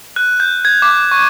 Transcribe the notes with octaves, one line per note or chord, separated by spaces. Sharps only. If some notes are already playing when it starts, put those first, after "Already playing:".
F#6
G6
G#6
D6
C#6